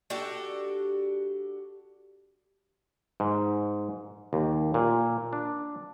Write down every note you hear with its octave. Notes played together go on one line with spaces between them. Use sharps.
D4 F#4 G4 A4
G#2
D#2
A#2
D4